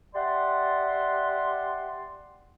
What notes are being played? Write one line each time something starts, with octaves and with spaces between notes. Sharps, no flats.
G4 D5 E5 F#5 C6